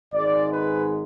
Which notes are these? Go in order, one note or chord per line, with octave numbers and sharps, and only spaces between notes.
G#1 G#2 G#3 D5
B4